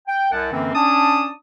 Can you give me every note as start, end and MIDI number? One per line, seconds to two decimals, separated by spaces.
0.08 0.29 79
0.31 0.49 36
0.31 0.49 42
0.31 0.49 78
0.31 0.49 81
0.52 0.73 42
0.52 0.73 50
0.52 0.73 52
0.52 0.73 58
0.52 0.73 60
0.74 1.29 61
0.74 1.29 62
0.74 1.29 81
0.74 1.29 87